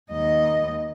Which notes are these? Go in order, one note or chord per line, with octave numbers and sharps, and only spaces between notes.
D#2 D#5